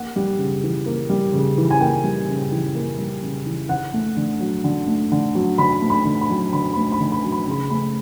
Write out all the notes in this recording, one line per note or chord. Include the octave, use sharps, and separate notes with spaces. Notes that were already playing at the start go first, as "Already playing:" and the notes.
Already playing: A#3 F#5
G3
C#3
E3
A#3
G3
C#3
E3
G#5
A#3 G5
G3
C#3
E3
A#3
G3
C#3
E3
D3 F#5
A3
D3
F#3
D3
A3
D3
F#3
D3 B5
A3
B5
D3
B5
F#3
D3 B5
A3 B5
B5
D3
B5
F#3
B5
C#3 B5
A3 B5